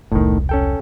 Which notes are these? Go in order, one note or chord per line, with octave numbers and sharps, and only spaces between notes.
E1 C2 A2 D#3
C#4 A4 G5